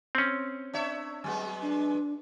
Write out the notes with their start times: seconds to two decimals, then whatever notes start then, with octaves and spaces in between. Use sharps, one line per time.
0.15 C4 C#4
0.73 D4 C#5 E5
1.24 F#3 G#3 B3
1.62 D4